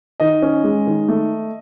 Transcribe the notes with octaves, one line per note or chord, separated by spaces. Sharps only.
D#3 D#5
C#4
G#3
D#3
A3